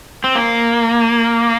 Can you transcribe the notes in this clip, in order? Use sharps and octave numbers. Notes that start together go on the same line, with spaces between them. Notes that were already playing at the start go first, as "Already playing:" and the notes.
C4
A#3